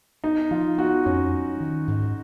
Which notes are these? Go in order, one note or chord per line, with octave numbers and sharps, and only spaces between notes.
B3 D#4
F3 F4
B3 F#4
F2 C#4
F#3
D#3
G#2